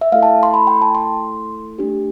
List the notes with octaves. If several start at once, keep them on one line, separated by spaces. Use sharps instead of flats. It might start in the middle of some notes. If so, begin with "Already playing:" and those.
E5
A3 E4 A4 F5
A5
C6
B5
G5
A5
C6
A3 D4 G4